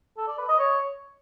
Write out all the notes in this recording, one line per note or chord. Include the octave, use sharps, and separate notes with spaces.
A4
D5
B4
D#5
C#5